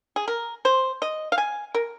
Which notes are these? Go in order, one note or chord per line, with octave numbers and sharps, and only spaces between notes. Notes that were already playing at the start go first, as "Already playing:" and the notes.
G#4
A#4
C5
D#5
F5
G#5
A#4